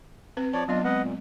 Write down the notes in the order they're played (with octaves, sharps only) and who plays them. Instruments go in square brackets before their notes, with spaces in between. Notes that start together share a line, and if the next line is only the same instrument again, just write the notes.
[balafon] C4 B4
[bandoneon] F3 C#5 D5 [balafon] A5
[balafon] F#3 B3 D#5 [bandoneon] D4 F4
[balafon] G#3 C4 [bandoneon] B4 D#5 F#5
[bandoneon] A#2